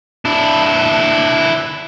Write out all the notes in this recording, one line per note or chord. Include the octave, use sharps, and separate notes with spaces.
D4 E4